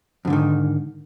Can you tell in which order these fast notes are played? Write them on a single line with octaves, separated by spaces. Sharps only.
F2 D3 G#2 D#3